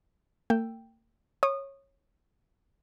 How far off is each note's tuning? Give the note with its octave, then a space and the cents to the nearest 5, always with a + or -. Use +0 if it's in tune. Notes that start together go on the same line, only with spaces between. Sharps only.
A#3 -45 G5 +0 E6 +5
C#5 -15 D#6 -25